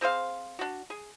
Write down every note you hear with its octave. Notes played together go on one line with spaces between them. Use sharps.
C4 G#4 C5 F5
D4 F#4
G#4